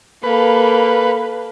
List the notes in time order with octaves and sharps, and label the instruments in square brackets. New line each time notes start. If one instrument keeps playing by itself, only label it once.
[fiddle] A#3 A4 [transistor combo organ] B4